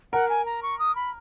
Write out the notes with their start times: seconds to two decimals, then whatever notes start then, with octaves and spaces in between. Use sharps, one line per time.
0.13 A#4 F#5
0.29 G#5
0.46 A#5
0.63 C#6
0.79 D#6
0.96 B5